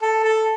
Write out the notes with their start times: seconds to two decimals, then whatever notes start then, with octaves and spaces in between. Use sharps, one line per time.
0.02 A4
0.23 A4